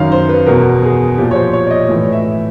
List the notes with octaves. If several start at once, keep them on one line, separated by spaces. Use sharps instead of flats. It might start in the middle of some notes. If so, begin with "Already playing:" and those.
Already playing: F#2 D#3 F5
C5
B4
E2 B2 A#4
G#4
A#2 F3 G4
C#5
C5
C#5
D5
D#5
A2 E3
E5